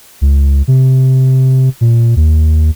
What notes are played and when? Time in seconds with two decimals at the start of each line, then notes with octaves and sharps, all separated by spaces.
0.21 C#2
0.68 C3
1.81 A#2
2.16 D#2